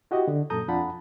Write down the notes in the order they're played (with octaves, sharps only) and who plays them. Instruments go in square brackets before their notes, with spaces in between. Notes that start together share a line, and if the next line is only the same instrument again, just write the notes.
[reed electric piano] E4 F#4 G4 D#5
D3
F#2 A#2 A4 A#5 D#6 G6
F2 D4 F4 F#5 A5 B5